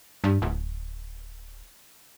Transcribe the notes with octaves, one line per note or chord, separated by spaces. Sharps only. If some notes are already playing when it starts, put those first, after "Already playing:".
G2
D1